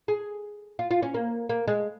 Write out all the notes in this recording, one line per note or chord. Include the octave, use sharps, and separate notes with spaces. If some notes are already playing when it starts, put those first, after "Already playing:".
G#4
F4
F4
C#4
A#3
A#3
G#3